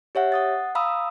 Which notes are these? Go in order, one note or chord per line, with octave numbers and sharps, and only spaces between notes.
G4 C#5 E5 F#5
F#5 D#6 A6
F5 A#5 B5 D#6 E6